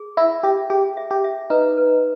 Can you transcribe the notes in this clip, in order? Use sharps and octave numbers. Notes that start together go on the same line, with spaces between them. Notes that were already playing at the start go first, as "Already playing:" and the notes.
Already playing: G#4
E4 E5
G4 E5
G4 G#4
E5
G4
E5
D#4 B4
B4